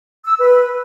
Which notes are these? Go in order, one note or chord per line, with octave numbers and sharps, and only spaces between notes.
E6
B4